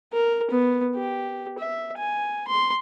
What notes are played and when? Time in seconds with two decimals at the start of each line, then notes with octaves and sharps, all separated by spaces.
0.13 A#4
0.51 B3
0.96 G4
1.58 E5
1.98 G#5
2.48 C6